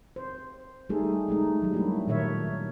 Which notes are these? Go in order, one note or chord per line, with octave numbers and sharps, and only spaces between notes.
C5
G3 A3 D#4 G#4 A4
G#3 A3 D#4
F#3 G3
A3 A#3 D4 E4
A#2 D#3 A#4 C#5 E5